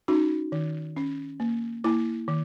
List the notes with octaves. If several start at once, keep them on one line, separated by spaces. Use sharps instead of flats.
C#4 D#4 F#4
D#3
C#4
A#3
A#3 E4
D#3